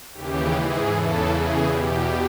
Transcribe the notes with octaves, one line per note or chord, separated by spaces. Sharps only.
D#2 C#3 E3 G4
G#2 E3 G#4
E2 C#3 E3 A4
E2 C#3 E3 G#4
E2 B2 G4